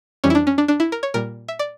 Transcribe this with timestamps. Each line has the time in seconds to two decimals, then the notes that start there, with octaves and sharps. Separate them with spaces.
0.24 F2 E3 G3 C#4
0.30 E4
0.35 D4
0.47 C#4
0.58 D4
0.68 D4
0.80 E4
0.92 A#4
1.03 C#5
1.14 A#2 G3 A#4
1.48 E5
1.59 D5